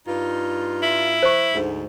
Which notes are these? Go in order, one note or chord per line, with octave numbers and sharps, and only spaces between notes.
G2 D#4 F4
E4
C5 C#6
D2 G#2